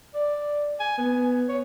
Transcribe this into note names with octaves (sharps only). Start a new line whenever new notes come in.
D5
G#5
B3
C#5